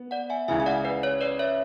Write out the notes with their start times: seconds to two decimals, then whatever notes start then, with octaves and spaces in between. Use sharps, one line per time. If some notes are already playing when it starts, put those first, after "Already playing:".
Already playing: B3
0.11 D5 F#5
0.30 E5 G#5
0.48 C#2 C#3 E3 E5 G#5
0.60 G#5
0.66 D5 F#5
0.85 B4 D5
1.03 C#5
1.21 B4 D5
1.39 C#5 E5